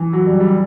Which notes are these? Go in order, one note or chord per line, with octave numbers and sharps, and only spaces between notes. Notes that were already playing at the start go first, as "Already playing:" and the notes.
Already playing: E3
F#3
G3
G3